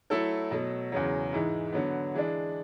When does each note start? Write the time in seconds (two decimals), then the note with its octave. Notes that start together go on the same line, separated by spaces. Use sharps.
0.10 F#3 A3 E4 A4
0.51 B2 F#3 A3
0.92 E2 C#3 F#3
1.32 G#2 E3 G#3
1.73 D3 F#3 B3
2.14 E3 G#3 D4